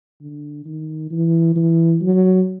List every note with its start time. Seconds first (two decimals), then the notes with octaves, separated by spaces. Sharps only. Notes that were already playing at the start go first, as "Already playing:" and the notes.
0.21 D3
0.66 D#3
1.11 E3
1.56 E3
2.02 F#3